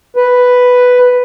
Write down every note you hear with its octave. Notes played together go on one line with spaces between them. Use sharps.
B4